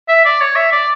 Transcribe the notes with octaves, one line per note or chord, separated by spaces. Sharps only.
E5
D5
C#5
E5
D5